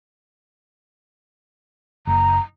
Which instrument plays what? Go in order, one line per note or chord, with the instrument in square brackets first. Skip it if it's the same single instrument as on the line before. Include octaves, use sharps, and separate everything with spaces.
[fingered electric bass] F#1 [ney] A#5